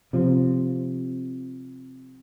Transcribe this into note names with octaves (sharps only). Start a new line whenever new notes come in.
C3 F3 C4